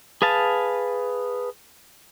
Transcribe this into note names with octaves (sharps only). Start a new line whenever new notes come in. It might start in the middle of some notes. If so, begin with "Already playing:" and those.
G#4 B4 F5 A5